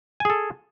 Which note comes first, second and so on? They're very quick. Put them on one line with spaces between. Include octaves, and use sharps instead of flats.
G#5 G#4 A4